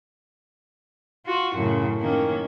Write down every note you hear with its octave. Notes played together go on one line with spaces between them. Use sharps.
F4 F#4
F#2 A2 C#3
D#3 A#3 C#4